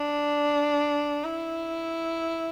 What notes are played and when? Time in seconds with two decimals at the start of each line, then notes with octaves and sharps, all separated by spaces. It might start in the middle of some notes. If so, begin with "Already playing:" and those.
Already playing: D4
1.25 E4